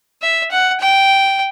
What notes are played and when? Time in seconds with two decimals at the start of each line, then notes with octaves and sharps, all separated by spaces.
0.22 E5
0.51 F#5
0.80 G5